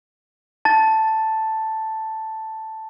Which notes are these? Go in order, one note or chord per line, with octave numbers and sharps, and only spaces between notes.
A5 A6